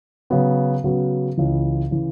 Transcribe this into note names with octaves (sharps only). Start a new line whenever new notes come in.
C#3 F#3 B3 F#4
C#3 F#3 B3 F#4
C#2 C#3 E3
C#3 E3